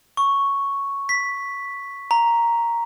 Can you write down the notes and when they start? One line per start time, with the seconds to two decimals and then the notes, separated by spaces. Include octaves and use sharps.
0.17 C#6
1.09 B6
2.11 A#5